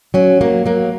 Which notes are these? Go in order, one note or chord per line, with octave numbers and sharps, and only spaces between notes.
F#3 C#4
F#3 A#3
F#3 A#3